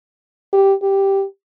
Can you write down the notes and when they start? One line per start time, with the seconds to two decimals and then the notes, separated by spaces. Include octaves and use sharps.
0.53 G4
0.82 G4